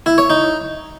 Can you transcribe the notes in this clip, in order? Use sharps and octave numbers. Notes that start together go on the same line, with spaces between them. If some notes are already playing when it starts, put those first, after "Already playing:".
E4
C#5
D#4